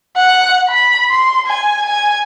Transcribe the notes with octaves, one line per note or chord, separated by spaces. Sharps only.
F#5
B5
C6
G#5
G#5